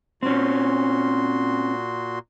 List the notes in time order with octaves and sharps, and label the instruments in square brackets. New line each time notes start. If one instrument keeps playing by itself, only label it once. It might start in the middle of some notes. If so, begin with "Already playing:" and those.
[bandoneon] A#2 F#4 C6 [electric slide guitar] C4 C#4